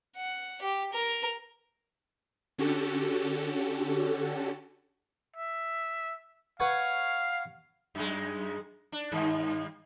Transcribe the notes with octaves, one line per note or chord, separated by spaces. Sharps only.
F#5
G4
A#4
D3 C#4 F#4 G4 A4
E5
B4 C#5 F5 F#5
F#2 G#3
D4
G2 D#3